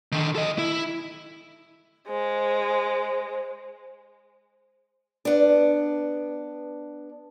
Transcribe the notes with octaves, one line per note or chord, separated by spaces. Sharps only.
D3 D#3
A4 D#5
E4
G#3 C5
B3 D4